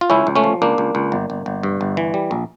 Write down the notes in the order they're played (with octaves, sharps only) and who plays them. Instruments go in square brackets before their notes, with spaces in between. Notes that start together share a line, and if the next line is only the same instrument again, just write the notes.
[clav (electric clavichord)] F4
C#2 C#4 E4
C#2
A3 C#4
F3
C#2 A#3 D4
C#2
C#2
G1
G1
G1
G2
G1
E3
G3
A#1